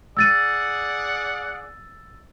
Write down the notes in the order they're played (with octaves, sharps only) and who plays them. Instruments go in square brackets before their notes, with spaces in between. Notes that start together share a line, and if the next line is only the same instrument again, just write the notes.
[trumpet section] G#4 D5 F#5 [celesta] E6 A6 D#7